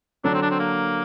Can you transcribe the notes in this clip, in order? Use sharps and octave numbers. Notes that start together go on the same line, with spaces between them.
D3 F#3 D4
C4
D4
C4
A#3